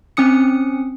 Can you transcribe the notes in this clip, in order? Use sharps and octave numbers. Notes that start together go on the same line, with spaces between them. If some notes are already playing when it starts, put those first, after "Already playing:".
C4 C#4 D#6 C#7